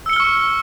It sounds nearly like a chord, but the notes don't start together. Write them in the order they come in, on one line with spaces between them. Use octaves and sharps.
E6 C#7 G7 F6 C#6